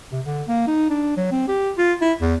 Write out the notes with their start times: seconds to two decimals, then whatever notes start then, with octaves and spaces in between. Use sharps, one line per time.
0.12 C3
0.25 D3
0.48 A#3
0.67 D#4
0.90 D4
1.17 F#3
1.31 C4
1.48 G4
1.78 F4
2.02 E4
2.21 E2